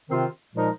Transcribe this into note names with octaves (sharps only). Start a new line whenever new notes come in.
C3 D#3 C4 F4 C5
A#2 F3 G#3 D#4 A#4